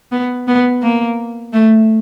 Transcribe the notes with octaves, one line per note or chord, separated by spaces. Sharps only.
B3
B3
A#3
A3